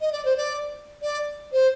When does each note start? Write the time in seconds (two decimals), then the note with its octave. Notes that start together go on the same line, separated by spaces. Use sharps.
0.01 D#5
0.12 D5
0.25 C5
0.37 D5
1.02 D5
1.52 C5